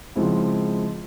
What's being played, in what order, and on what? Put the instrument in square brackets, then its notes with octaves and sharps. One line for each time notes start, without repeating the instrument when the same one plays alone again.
[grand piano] C#3 F3 G#3 C4 E4